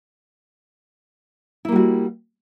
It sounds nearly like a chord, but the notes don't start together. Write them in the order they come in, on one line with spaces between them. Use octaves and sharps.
E4 A#3 G3 F#4